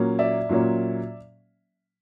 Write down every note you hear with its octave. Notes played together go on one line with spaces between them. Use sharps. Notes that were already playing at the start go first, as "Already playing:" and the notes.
Already playing: A#2 F#3 A#3 C#4
D5 E5
A#2 F#3 A#3 C#4